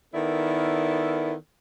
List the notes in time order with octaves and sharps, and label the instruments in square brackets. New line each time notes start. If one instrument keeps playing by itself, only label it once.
[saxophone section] D#3 B3 E4 A4 A#4 D5